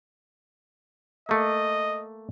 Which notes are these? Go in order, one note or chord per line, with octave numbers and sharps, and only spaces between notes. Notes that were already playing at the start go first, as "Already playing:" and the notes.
A3 A#3 D#5